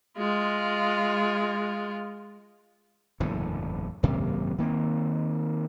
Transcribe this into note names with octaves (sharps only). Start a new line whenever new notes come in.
G#3 F4
F#1 E2 A2 D3
G#1 F#2 C3 A#3
D#3 A#3 C4